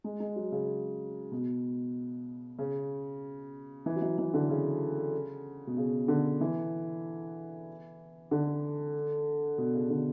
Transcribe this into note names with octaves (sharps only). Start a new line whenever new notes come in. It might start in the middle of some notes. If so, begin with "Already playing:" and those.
G#3
G#3
F#3
C#3
B2
C#3
E3
F#3
E3
E3
D3
C#3
B2
C#3
D3
E3
D3
B2
C#3
D3